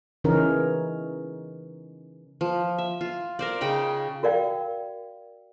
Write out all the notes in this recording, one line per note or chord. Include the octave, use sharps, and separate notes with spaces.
C#3 E3 C#4 D#4 A#4
F3
E5
F4
A#4 C5 D5
C#3 D#4 G5 B5
F#4 A#4 D5 F5 G5